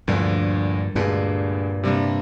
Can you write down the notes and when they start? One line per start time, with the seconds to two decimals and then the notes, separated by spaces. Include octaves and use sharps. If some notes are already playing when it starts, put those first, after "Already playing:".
0.08 D2 G2 A#2 D3 F3
0.95 D2 G2 A#2 D3 G#3 D4
1.83 C3 G3 A#3 D4